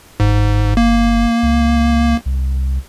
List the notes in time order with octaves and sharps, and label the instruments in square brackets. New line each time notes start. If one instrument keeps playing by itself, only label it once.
[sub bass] G1 [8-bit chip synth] G#2
[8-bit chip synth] A#3
[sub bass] C#2
C2